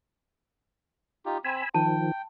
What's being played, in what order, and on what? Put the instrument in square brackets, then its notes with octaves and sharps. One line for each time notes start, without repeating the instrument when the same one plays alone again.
[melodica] D#4 F4 G4
[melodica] C4 [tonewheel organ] G#5 B5 E6
[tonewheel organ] D#3 F3 [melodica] G5 [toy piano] A5